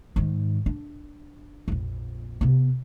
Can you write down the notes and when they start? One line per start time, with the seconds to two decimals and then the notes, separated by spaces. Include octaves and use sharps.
0.16 G#2 D#3
0.66 D4
1.68 A#1 F2
2.41 C3 B3